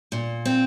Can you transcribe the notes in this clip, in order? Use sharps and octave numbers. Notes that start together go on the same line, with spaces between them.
A#2
C4